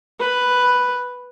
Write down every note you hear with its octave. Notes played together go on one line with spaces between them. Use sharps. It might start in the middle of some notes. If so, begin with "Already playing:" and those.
B4